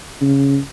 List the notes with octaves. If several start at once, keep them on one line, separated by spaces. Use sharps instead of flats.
C#3